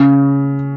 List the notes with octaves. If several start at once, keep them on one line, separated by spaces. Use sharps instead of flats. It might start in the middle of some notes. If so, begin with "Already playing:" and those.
Already playing: C#3